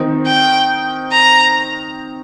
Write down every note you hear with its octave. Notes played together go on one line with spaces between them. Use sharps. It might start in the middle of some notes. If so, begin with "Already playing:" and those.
Already playing: D#3 C4 D#4
G5
A#5